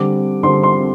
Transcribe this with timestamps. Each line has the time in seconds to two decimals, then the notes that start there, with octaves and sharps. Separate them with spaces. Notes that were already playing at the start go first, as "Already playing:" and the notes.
Already playing: D3 G3 C4 D6
0.43 D3 G3 C4 C6
0.63 C6